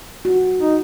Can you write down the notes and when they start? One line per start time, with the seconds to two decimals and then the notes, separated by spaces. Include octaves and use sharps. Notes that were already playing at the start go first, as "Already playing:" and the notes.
0.25 F#4
0.60 D#4